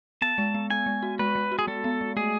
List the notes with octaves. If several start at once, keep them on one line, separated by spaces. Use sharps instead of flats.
B3 A5
G#3
B3
B3 G#5
G#3
F#4
G#3 B4
G#3
F#4
G#4
G#3 A4
B3
G#3
A3 G#4